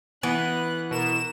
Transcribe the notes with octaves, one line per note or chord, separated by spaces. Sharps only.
E3 B3 F#6
B2 A#4 E7